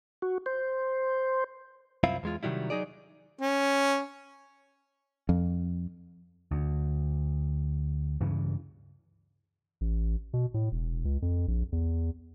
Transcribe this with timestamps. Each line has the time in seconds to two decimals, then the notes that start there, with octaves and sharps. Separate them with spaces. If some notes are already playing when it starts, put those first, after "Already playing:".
0.22 F#4
0.46 C5
2.04 C2 F#2 C4 E4 F4 F5
2.23 E2 G#3 F4
2.43 C3 D#3 F#3 G3 E4
2.70 F#3 D#4 G#4 D5
3.41 C#4
5.29 F2
6.51 D2
8.21 G2 C#3 E3
9.81 A1
10.33 B2
10.54 A2
10.72 E1
11.05 C#2
11.22 F2
11.48 A#1
11.72 E2